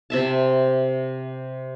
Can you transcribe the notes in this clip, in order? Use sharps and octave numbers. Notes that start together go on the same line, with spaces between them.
C3 E5 A5